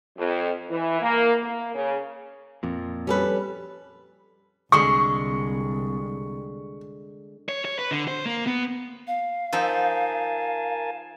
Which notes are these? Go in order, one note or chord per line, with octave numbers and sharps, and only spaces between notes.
F2
E3
A#3
A#3
C#3
F2 A#2
G3 C#4 A4 B4
C2 D3 G#3 C#6
C#5
C#5
B4
D3
C5
A#3
B3
F5
F3 D#4 A#4 E5 G#5 A5